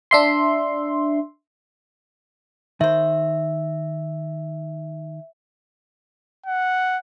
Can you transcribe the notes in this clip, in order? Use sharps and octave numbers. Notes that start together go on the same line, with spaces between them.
D4 E5 C6
D#3 C5 E5
F#5